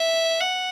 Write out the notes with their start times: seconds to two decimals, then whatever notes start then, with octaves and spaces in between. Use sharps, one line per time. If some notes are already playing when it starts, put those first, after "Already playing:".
Already playing: E5
0.40 F#5